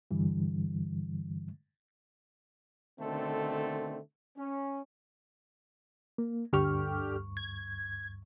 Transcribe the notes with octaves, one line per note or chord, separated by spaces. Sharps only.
G2 D3 E3 G3
B2 D3 D#3 A3 C4 A4
C#4
A#3
D2 G2 D3 G4 C#6 F6
G#6